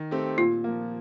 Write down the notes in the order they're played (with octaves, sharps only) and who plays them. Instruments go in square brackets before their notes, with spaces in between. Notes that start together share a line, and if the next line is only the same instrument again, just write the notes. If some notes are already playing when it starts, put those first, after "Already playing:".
Already playing: [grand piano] D#3
A3 C4 G4
[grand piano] A#2 [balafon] F4
[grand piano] F3 A#3